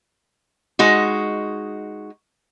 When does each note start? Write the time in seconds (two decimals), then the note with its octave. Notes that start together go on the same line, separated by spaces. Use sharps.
0.79 G#3 D#4 F#4